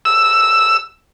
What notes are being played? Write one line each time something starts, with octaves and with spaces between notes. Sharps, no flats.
E6